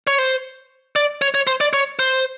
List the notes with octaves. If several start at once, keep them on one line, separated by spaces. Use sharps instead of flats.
C#5
C5
D5
C#5
C#5
C5
D5
C#5
C5